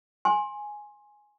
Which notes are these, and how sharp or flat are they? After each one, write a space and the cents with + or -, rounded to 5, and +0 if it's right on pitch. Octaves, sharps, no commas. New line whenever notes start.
G#5 +0 C6 +25